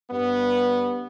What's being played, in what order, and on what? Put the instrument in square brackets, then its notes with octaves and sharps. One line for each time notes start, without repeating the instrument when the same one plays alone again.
[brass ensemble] G2 B3